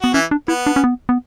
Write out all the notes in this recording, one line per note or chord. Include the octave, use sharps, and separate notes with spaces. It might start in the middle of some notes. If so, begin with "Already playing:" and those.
B3 F#4
E3 C#4 E4
D4
B3 E4
D4
C#4
B3
B3